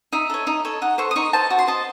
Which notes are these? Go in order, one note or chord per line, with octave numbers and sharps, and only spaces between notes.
D#4 E5
A4 C#5
D#4
A4 C#5
D#4 F#5
A4 C5 C#6
D#6
D#4 C#6
A4 C5 A5
F#4
C6
C5 D#5 A5